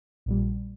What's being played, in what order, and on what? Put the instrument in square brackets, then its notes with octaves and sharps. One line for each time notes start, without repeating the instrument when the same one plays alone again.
[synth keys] A#1 A#2 G3